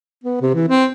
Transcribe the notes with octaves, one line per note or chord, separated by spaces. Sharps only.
B3
C3
E3
C4